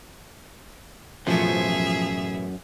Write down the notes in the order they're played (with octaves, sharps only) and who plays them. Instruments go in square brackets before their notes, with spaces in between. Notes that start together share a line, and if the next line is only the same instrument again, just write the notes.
[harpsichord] A1 B2 C#5 [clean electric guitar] F#2 [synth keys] F3 [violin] G#4 E5